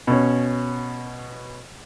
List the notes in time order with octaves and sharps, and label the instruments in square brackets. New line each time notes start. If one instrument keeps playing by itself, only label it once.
[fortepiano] B2 C#4